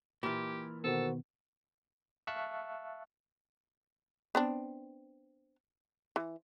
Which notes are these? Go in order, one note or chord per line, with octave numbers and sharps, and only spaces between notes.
A#2 E3 G4 B5 F6
B2 D#3 B3 F#4 A4 A#4 C5
E5 F5 A5 C#6 E6 F#6
B3 C4 D4
E3